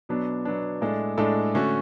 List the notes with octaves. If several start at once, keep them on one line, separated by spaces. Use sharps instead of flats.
B2 F#3 B3 D4
B2 F#3 B3 D4
A2 G#3 D4 A4
A2 G#3 D4 A4
D3 A3 C#4 F#4